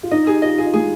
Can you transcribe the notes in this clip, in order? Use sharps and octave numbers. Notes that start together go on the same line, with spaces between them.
F4
D#4 D#5
G4 G#4
F4 D#5
F4 G#4
G#3 G#4